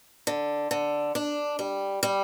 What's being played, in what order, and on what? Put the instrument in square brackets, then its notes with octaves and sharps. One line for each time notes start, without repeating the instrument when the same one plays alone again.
[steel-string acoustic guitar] D3
D3
D4
G3
G3